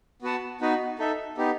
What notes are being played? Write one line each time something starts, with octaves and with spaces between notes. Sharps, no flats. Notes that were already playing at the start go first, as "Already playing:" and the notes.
B3 F#4 B4 F#5 A5
B3 D#4 F#4 B4
D#4 A4 E5
B3 D#4 G4